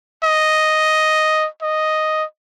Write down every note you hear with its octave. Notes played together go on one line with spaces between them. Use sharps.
D#5
D#5